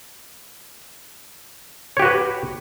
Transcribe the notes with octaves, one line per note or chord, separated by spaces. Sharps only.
F#4 G4 B4 C#5